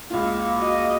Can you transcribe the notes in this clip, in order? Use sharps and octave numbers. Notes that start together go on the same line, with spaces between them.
C#2 A#3 F4
F#4 D#5